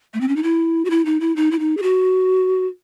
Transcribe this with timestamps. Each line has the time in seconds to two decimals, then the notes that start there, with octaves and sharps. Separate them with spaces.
0.14 A3
0.21 C4
0.28 C#4
0.36 D#4
0.43 E4
0.85 F#4
0.90 E4
1.05 D#4
1.20 E4
1.36 D#4
1.51 E4
1.59 D#4
1.77 G#4
1.82 F#4